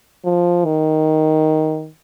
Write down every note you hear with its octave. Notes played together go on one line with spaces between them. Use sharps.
F3
D#3